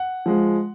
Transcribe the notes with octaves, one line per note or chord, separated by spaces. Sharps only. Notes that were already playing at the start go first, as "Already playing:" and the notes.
Already playing: F#5
F3 G#3